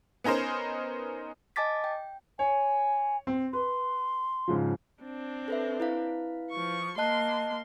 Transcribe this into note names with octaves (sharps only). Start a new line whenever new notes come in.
B3 C#4 D#4 A#4 C5
D#5 G#5 A5 D6 A6 B6
G5
C#5 G#5
C4
B4 C6
G#2 C#3 F3
C4 D4
A4 B4 E5
E4 B4 F5
F3 C#6
A#3 D#5 A5 C6 F#6